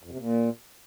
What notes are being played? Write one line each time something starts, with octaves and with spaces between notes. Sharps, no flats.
F2
C3
A#2